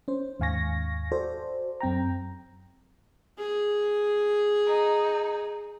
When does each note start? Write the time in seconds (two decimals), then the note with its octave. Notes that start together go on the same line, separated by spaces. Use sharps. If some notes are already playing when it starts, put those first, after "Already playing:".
0.08 C#4 C5
0.40 D#2 G#2 F5 G#5 C#6 A#6
1.12 F#4 A4 C5 D5
1.81 F#2 C4 G5 A#5
3.38 G#4
4.68 D#4